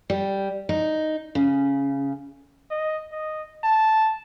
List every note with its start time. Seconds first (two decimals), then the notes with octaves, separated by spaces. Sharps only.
0.10 G3
0.69 D#4
1.35 C#3
2.70 D#5
3.12 D#5
3.64 A5